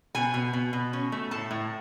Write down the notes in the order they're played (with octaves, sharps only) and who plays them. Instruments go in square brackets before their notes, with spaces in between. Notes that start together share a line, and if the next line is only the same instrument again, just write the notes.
[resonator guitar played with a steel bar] B2 G#5
B2
B2
B2
C#4
A3
A2 A5
A2